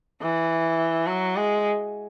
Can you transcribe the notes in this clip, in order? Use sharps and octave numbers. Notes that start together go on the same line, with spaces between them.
E3
F#3
G#3